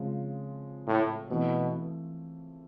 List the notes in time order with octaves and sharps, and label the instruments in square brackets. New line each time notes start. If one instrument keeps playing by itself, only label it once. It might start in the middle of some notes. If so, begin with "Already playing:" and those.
Already playing: [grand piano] C#3 F3 G#3 C4 F4
[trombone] A2
[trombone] B2 [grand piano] E3 A3 C4